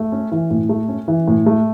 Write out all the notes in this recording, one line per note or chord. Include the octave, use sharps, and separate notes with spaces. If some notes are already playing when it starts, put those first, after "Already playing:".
Already playing: A3
C#4
E3
A2
A3
C#4
E3
A2
A3